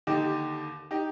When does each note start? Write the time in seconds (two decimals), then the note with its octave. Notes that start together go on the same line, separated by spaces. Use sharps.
0.07 D#2 D3 D#4 G4
0.91 D#4 G4